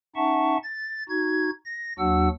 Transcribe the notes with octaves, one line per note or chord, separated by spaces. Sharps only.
C#4 D#4 E5 F#5 A5 C#6
A6
D#4 F#4 G#6
A#6
D#2 F#3 D4 F#4 F#5 E6